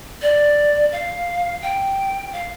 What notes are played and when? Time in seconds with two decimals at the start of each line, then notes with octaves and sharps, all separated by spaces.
0.22 D5
0.92 F5
1.62 G5
2.33 F5